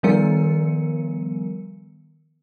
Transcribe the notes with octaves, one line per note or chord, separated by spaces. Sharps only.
D#3 F3 G3 B3 A#4 C#7